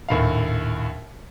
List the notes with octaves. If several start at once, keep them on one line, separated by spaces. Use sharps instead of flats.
A#1 D#2 A2 F5